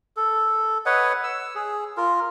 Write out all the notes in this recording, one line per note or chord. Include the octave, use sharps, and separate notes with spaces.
A4
B4 C#5 D#5 F#5
E6
G#4
F4 A#4